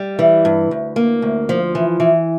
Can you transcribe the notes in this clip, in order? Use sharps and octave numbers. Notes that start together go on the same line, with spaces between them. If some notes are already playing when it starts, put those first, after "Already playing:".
Already playing: G3
E3
G2
D2
A#3
D2
F3
E3
E3